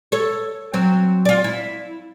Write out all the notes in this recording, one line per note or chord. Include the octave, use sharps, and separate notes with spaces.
A4 C#5
F#3 C4
F4 D5
E4